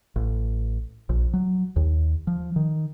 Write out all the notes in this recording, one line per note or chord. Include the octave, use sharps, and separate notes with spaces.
A1
A#1
F#3
D#2
F3
D#3